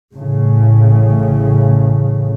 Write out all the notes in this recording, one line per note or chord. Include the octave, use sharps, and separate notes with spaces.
A1 A2 C#3